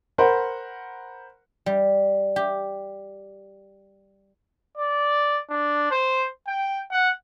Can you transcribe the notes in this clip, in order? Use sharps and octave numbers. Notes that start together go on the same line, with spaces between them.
A#4 C5 F#5 B5
G3
G4
D5
D4
C5
G5
F#5